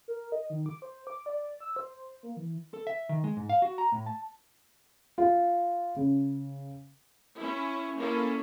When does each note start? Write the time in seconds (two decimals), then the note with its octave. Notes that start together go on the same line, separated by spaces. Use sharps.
0.08 A#4
0.32 D#5
0.50 D#3
0.66 D6
0.82 C5
1.07 D6
1.26 D5
1.60 E6
1.76 C5
2.23 A#3
2.37 E3
2.74 A4
2.87 E5
3.09 D#3
3.24 G#3
3.37 G#2
3.50 F5
3.62 F#4
3.78 A#5
3.92 A2
4.06 A5
5.18 F4
5.96 C#3
7.36 C#4 E4
7.95 A#3 C#4 E4 A4